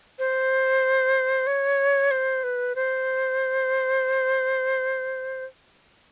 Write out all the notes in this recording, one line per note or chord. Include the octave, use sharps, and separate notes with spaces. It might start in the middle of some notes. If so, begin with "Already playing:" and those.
C5
C#5
C5
B4
C5